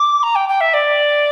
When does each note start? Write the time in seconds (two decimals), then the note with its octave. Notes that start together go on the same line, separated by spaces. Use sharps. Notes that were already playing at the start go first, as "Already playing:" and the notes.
Already playing: D6
0.22 A#5
0.35 G5
0.48 G5
0.60 E5
0.73 D5